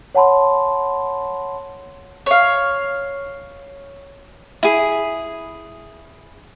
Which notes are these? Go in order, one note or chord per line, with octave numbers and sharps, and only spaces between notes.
C#5 F#5 A5 B5 C6
C#5 F5
E4 G#4